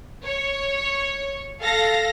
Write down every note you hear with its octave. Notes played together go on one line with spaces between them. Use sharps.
C#5
A4 F5 A#6